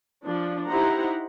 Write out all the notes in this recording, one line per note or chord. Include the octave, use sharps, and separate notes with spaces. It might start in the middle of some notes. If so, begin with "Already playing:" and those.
F3 D4
D#4 E4 G4 C5 F#5 A#5